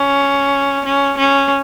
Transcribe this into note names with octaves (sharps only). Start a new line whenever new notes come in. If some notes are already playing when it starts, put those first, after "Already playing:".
Already playing: C#4
C#4
C#4